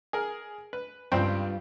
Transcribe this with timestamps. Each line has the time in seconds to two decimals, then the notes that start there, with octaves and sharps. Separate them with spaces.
0.13 G#4 A#4
0.73 B4
1.12 C#2 G2 C4 F4 G4 G5